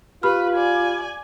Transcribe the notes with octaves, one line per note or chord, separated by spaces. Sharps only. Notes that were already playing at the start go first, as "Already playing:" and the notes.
F4 G4 B4 B5 F6
D5 G#5